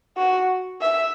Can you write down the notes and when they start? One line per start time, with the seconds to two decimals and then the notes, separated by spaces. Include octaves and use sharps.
0.17 F#4
0.81 E5